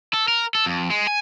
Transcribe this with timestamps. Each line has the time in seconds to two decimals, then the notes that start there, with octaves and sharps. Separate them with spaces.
0.14 A4
0.28 A#4
0.55 A4
0.66 F2
0.90 G#3
1.07 G#5